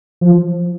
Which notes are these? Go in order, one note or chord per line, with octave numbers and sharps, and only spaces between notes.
F3